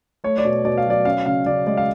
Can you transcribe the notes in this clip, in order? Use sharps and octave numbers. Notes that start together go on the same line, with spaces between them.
A3 C#5
D5
B2
B2 D5
F5
F#3 D5
C#4 F5
C#3 F5
C#3 D5
G#3 D5
F5